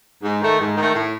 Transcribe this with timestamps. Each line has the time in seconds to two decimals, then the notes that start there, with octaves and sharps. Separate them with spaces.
0.23 G#2
0.41 D#3 A3
0.59 G#2
0.77 D#3 A3
0.94 A2